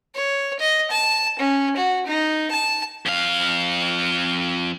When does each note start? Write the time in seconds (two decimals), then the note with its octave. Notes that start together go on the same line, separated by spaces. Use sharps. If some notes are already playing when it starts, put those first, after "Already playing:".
0.15 C#5
0.60 D#5
0.91 A5
1.39 C#4
1.77 F#4
2.06 D#4
2.51 A5
3.06 F2 F5